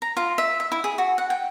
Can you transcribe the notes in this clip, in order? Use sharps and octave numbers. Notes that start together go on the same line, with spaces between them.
A#5
F4
E5
E5
E4
G#4
F#4
F#5
G5